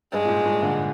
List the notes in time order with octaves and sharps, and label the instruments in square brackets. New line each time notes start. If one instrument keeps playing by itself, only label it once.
[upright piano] G2 [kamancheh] G#3
[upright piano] A#2
G#2
G2 A#2
A#2 D3